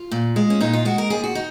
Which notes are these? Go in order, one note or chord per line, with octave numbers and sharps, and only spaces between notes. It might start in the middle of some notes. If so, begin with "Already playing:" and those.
Already playing: F4
A#2
G#3
C#4
A#2 D#4
F4
G#3 F#4
A#4
D#2 G#4
F#4
D#4